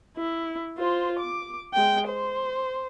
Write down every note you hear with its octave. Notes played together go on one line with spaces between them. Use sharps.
E4
F4 C5
D6
G#3 G5
C5